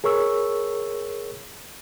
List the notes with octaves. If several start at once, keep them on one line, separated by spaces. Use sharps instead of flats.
G#4 A#4 C#5 C#6 E6